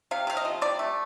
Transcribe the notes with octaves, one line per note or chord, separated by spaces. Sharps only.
C3 F5
C3 F5
D#5
F3
C3 D5
A3